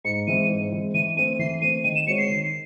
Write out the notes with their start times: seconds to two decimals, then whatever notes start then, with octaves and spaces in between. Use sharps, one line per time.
0.05 G#2 C#7
0.27 E3 G#3 C4 E4 D#7
0.50 G#2
0.72 E3 G#3 C4 E4
0.94 E3 D#7
1.17 A3 C4 D#7
1.39 E3 C7
1.62 A3 D#7
1.65 C4
1.84 D#3 D#7
1.95 E7
2.07 G#3 C4 F#4 C#5 C#7
2.18 C7
2.29 D#3